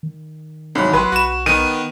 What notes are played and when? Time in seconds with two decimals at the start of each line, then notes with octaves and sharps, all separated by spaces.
0.03 D#3
0.75 C2 G#2 F#3 B5
0.93 A1 F#3 B4 C6
1.12 B1 F#4 E7
1.46 D#3 B3 D#7